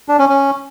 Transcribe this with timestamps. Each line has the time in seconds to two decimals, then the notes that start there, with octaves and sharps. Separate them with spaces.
0.09 D4
0.19 C#4
0.29 C#4